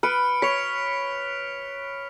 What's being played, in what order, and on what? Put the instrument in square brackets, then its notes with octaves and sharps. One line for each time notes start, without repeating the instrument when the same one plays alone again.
[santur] B4 [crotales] F6 C#7 D7
[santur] C#5 [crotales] B6 F7